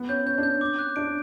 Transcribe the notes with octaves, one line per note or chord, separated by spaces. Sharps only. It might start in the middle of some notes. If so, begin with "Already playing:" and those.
Already playing: B3
C#4 G6
C#4 G6
D4
G6
C#4
D6
F#6
D4 D7